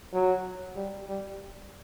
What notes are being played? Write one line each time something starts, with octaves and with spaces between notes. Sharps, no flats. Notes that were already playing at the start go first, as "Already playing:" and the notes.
F#3
G3
G3